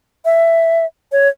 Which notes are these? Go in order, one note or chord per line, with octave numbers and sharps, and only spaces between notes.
E5
C#5